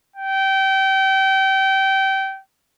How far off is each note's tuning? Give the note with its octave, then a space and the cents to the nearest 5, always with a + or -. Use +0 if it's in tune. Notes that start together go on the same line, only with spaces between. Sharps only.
G5 -25